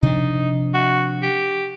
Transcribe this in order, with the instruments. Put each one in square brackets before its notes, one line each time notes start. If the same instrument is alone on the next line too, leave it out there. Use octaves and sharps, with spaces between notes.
[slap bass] C3 F3 D4 [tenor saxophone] D#4
[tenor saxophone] F#4
G4